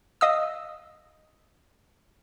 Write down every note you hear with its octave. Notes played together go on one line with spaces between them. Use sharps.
D#5 F5 D#6 E6